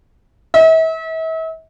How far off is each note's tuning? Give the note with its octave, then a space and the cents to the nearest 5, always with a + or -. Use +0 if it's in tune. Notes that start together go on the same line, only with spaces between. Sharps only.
E5 -40